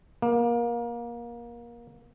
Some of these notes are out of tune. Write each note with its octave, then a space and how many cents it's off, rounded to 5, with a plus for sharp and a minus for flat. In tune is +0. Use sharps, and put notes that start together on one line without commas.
A#3 +25